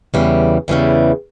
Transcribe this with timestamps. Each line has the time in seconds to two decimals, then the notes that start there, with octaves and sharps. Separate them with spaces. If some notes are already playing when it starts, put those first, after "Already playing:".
0.14 E2 C#3 E3 G3
0.68 E2 C#3 E3 G3